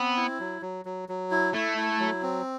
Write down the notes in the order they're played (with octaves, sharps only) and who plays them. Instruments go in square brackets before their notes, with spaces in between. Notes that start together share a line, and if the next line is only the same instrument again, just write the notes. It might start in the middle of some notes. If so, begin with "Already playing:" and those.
Already playing: [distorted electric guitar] B3 [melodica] C4
[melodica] E4
F#3
F#3
F#3
F#3
E4
[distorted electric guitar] A3 [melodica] E4
[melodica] E4
F#3
C4